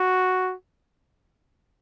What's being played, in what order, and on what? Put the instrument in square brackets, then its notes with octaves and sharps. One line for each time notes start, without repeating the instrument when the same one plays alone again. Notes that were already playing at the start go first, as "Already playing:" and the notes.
Already playing: [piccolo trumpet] F#4